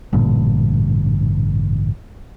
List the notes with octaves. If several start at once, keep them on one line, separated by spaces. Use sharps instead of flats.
A1 G2 A#2 D3